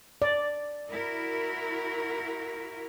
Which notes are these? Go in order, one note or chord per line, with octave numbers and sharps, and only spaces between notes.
D5
E4 F#4 A#4